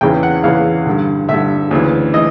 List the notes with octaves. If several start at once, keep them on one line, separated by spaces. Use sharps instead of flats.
E2 C#3 E3 G5
F#5
E2 C#3 E3 F5
G2 D3
G2 D3 E5
D2 C#3 E3
E3 D#5